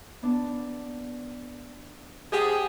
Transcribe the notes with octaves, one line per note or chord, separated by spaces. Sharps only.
B3 D4
F3 G4 G#4 F#5